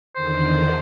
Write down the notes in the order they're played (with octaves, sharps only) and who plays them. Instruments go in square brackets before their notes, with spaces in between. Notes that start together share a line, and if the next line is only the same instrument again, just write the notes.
[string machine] E2 D3 D#3 [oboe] C5